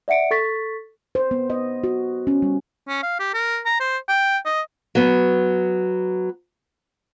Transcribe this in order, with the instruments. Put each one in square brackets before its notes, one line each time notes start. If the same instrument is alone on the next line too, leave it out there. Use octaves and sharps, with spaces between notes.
[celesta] D5 E5 F#5 C#7 D7
A4 C#6 A6 B6
[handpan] C5
B3
D#5
F#4
C#4
G3
[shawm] C#4
F5
G4
A#4
A#5
C5
G5
D#5
[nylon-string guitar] F#3 B3